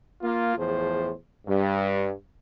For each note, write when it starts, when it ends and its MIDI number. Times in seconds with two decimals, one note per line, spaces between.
0.21 0.55 58
0.21 0.55 65
0.56 1.12 40
0.56 1.12 45
0.56 1.12 53
0.56 1.12 68
0.56 1.12 72
1.47 2.11 43